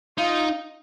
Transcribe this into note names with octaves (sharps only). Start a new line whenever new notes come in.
D#4 F4